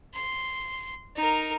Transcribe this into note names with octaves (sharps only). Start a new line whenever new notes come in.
C6
D#4 A#4